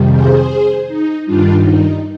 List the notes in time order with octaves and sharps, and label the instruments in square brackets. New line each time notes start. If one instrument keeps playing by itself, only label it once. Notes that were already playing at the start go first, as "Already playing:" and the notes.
Already playing: [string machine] F2 C3 D#3 G3
G#4 C5
D#4
G2 D#3 G3 D4 F4
D#4